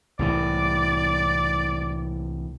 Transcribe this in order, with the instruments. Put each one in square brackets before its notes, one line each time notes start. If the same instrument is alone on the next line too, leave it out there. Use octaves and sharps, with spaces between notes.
[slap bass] C2 A2 E3 [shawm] D5